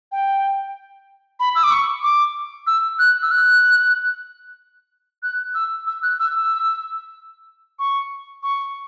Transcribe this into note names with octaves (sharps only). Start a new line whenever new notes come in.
G5
B5
E6
D6
C#6
D6
E6
F#6
E6
F#6
F#6
E6
E6
F#6
E6
E6
C#6
C#6